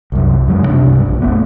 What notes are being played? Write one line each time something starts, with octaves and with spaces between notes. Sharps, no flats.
C2 F#2
G2 C#3 F#3 G#3
C2 G2 C3 D4
G2
A#1
F#1 A3 B3